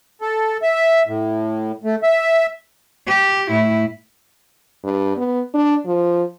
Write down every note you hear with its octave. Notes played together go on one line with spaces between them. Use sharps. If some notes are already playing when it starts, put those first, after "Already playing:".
A4
E5
A2
A3
E5
G4
A2 E4
G2
B3
D4
F3